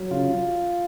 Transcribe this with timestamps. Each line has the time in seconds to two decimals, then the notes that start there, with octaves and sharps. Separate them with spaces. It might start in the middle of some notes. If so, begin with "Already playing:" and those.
Already playing: F#3
0.11 C#3 F4